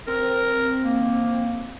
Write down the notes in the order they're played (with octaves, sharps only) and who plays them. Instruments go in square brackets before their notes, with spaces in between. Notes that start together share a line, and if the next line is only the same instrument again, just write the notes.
[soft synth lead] C4 [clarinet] A#4
[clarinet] A#3